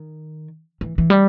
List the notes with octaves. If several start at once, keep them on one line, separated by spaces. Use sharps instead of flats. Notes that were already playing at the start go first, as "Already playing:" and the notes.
Already playing: D#3
E3
E3
G3